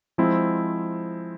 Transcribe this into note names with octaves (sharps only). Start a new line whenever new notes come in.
F3 G#3 C4 E4